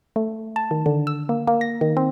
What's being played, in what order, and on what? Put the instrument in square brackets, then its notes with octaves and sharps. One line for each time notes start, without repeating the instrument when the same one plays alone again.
[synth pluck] A3
A5
D#3
D3
E6
A#3
A#3
A#6
D#3
C4